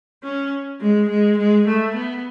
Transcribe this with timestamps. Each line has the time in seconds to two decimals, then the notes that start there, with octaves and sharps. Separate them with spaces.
0.23 C#4
0.80 G#3
1.09 G#3
1.38 G#3
1.67 A3
1.95 B3